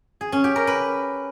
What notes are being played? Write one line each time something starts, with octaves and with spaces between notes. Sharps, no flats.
G#4
C#4
G4
A#4
B4